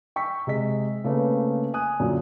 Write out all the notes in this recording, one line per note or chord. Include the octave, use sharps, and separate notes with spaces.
G5 C#6 E6 B6
C3 G#3 D#5 B6
C#3 A3 A#3 C4 B4
G#5 D#6 F#6
F#2 A#2 D3